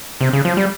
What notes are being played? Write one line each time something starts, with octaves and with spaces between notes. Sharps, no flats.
C3
C#3
F3
G3